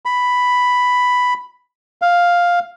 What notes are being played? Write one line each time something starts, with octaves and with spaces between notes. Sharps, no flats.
B5
F5